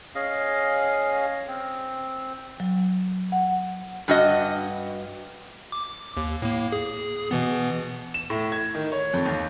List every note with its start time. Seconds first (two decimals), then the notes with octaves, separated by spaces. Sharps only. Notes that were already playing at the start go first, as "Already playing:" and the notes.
0.15 C#4 G#4 D#5 F5
1.48 C4
2.60 F#3
3.32 F#5
4.08 G2 F#4 D#5
5.72 D6
6.17 D#2
6.42 A2 A#3
6.72 G#4
7.31 B2 E3 B3
8.14 E7
8.30 A2
8.52 G#6
8.75 D#3
8.92 C#5
9.14 F2
9.26 D#2